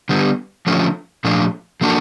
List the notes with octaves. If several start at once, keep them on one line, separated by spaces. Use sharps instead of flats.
D3 G3 B3
D3 F3 A3 C#4 F4
A#2 F3 A3 D4 F4
F3 A#3 D4 F#4 A4